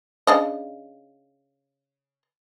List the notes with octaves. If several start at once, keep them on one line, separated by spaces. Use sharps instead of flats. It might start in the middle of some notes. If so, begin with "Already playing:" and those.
C#3 D4 D#5